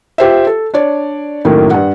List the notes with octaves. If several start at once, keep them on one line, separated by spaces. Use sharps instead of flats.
F4 G4 C5 E5
A4
D4 C#5 D5
F#2 A2 D#3 A#3
G2 F#5